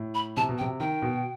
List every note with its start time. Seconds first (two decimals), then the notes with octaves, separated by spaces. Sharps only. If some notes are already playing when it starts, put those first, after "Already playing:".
Already playing: A2
0.15 B5
0.37 C3 A5
0.49 B2
0.58 G5
0.61 C3
0.80 D#3 G5
1.02 B2